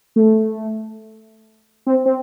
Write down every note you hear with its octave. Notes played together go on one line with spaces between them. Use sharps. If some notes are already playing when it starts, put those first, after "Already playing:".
A3
C4
C4